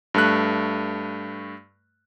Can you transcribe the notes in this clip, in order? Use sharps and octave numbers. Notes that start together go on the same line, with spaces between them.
G2 A3 F#6